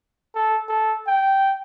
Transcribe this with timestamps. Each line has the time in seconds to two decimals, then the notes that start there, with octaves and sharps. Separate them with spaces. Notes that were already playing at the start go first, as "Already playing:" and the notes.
0.35 A4
0.69 A4
1.07 G5